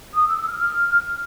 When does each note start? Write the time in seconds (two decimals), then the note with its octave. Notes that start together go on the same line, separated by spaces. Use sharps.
0.14 D#6
0.26 E6
0.37 E6
0.48 F6
0.59 F6